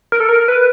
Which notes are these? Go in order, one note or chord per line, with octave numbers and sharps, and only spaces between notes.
A#4
A4
A#4
B4